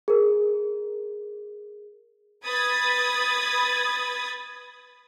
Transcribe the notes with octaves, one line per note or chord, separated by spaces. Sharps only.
G#4 A#4
B4 B5 D#6 G#6 A6